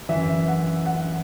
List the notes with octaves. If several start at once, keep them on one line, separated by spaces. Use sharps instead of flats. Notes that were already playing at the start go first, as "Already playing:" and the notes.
F#2 E3 E5
F#5
F#5